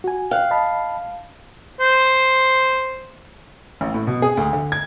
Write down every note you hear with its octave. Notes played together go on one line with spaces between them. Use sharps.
F#4 G#5
F5 G5 F#6
D#5 A5 B5
C5
A1
A2
B2
G#4
D2
D3
G#6